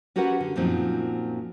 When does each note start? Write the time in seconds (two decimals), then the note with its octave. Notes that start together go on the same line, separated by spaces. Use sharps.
0.16 C#4 F#4 G4 A#4 B4 F#5
0.40 D3
0.56 F#2 A#2 F3 F#3 C4 D#4